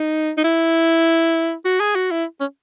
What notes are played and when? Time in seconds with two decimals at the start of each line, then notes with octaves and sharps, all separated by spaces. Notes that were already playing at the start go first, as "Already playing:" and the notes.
Already playing: D#4
0.38 D#4
0.44 E4
1.65 F#4
1.80 G#4
1.95 F#4
2.11 E4
2.40 C#4